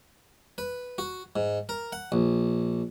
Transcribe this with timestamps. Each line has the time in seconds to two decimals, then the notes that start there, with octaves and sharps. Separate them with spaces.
0.58 B4
0.98 F#4
1.36 G#2
1.69 A#4
1.92 F#5
2.12 A#1